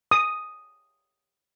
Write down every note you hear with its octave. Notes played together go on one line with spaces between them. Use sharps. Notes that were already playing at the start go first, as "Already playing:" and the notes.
D#6